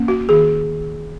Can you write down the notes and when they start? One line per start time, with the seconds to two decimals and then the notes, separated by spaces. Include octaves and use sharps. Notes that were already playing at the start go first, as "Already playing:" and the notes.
Already playing: A#3 C#4
0.08 F#4
0.29 D#3 G#4